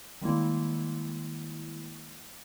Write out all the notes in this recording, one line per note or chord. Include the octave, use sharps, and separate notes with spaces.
D#3 G3 G#3 A#3 E4